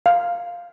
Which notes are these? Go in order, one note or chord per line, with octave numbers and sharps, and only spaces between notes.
F5